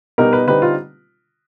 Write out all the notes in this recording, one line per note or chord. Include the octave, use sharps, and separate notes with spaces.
B2 G3 B3 D#4 A#4
B4
D3 G3 C4 D#4 B4
F4